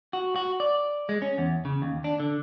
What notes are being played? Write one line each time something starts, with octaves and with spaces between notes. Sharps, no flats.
F#4
F#4
D5
G#3
C#4
E2
C#3
D#2
D4
D3